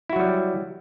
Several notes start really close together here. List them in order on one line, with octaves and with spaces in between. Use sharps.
E4 F#4 F#3 G3